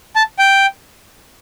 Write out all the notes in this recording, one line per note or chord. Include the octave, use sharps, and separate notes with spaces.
A5
G5